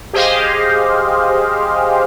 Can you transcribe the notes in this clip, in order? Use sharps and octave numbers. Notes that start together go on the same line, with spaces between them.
G4 G#4 C5 D#5 F5